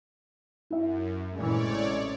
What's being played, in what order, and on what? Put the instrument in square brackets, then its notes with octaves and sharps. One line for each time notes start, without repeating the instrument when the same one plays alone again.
[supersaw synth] F#2 [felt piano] E4 E5
[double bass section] G2 A#2 E3 [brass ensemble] G#3 A3 C#4 [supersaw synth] C#5 D5
[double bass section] A1 A2 C3